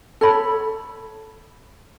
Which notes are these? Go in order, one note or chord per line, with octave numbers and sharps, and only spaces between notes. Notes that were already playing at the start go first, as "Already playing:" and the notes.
A4 C#5 B5